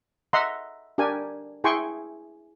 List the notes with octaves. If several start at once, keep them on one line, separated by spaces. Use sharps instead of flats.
D#5 E5 F#5 A#5 C6
D4 G4 A#4 G#5
E4 G#4 G5 G#5 C6 C#6